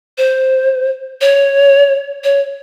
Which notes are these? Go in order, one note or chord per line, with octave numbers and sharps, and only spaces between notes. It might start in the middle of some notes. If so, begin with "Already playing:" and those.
C5
C#5
C#5